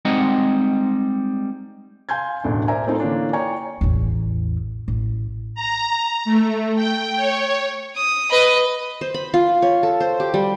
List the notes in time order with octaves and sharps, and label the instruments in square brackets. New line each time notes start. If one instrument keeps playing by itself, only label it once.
[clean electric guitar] G3 G#3 C4 D#4 D#5 F#5
[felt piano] F5 G#5 C6 G6 G#6
E1 A1 D2 D4
A#4 C5 D5 E5 G#5 A#5
A3 C4 D#4 F4 A4
D3 E3 A#3 C#4 D4
C#5 D5 G5 G#5 A#5 C#6
[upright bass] A1 E2
A1
[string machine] A#5
A3
G5
C#5
[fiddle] D#6
B4 D#5
[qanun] C5
B5
F4
C#5
A4
C5
G4
G3